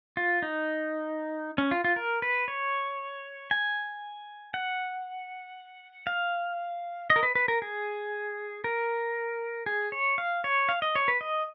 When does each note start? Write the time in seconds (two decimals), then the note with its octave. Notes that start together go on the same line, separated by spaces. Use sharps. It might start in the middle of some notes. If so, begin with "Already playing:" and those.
0.17 F4
0.42 D#4
1.58 C#4
1.71 F4
1.84 F4
1.96 A#4
2.22 B4
2.48 C#5
3.51 G#5
4.54 F#5
6.07 F5
7.10 D#5
7.16 A#4
7.23 B4
7.35 B4
7.48 A#4
7.62 G#4
8.64 A#4
9.66 G#4
9.92 C#5
10.18 F5
10.44 C#5
10.69 F5
10.82 D#5
10.95 C#5
11.08 B4
11.21 D#5